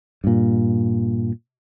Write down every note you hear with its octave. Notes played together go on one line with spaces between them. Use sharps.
G2 A#2